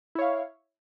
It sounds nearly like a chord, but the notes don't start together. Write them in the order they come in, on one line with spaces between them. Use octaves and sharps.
E4 C#5 F5